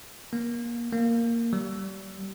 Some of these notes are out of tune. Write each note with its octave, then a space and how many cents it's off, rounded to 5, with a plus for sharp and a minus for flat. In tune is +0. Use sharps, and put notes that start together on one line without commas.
A#3 +25
A#3 -5
G3 -30